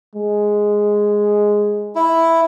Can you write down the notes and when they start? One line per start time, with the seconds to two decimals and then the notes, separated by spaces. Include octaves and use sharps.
0.16 G#3
1.95 E4